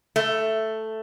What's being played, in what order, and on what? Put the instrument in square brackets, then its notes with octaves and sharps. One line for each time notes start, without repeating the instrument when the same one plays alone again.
[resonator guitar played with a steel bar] A3